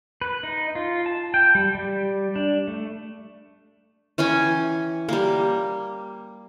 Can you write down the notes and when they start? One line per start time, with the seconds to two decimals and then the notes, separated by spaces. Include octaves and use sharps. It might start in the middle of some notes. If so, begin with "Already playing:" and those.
0.22 B4
0.43 D#4
0.75 F4
1.06 A5
1.34 G5
1.55 G3
1.75 G3
2.35 D4
2.67 A3
4.18 E3 C#4 G5 G#5
5.09 G3 A#3